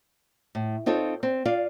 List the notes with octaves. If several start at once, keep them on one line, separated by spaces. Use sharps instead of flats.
A2
C4 D#4 F4 A4 C#5
C4
F4 D5 F5